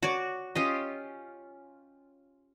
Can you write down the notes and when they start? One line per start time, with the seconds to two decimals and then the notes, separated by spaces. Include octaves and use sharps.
0.03 F#4 C#5 D5
0.55 C#4 F4 G4 D#5